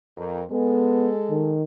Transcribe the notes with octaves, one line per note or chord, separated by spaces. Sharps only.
F2 A#4
G#3 B3 A4
D#3